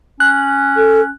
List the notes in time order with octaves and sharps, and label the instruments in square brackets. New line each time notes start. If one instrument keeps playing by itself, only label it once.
[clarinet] C#4 [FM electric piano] F#6
[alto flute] A4